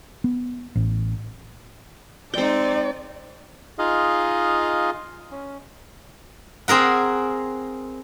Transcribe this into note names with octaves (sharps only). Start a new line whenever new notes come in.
B3
A1
G#3 C4 D#4 D5 G5
D#4 F4 G#4 D#5 F5
C#4
C4 G#4 A#4 F#5